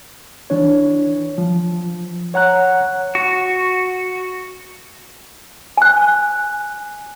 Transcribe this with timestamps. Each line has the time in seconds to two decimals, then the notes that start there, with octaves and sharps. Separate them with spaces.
0.50 E3 D4 C#5
1.38 F3
2.34 C#5 F#5 A#5 F#6
3.15 F#4
5.77 G#5 F#6